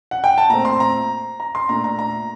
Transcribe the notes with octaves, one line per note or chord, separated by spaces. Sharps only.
F#5
G5
A5
A#2 A3 C4 A#5
C6
A#5
A#5
C6
A#2 A3 D4 A#5
A#5
A#5